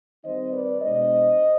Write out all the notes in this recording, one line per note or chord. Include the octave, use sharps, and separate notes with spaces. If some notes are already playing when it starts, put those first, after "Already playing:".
D#3 G3 C4 D#4 C5 D#5
B4 D5
B2 G#3 B3 D4 C5 D#5